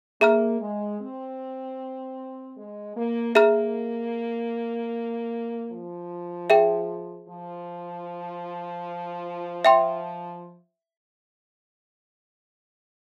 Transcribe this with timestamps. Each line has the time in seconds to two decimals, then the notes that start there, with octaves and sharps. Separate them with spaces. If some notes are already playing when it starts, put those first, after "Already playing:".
0.21 A#3 G#4 E5 A#5 F6
0.60 G#3
1.00 C4
2.57 G#3
2.96 A#3
3.35 A#3 G#4 E5 A#5 F6
5.71 F3
6.50 G#4 E5 G5
7.29 F3
9.65 E5 G5 C6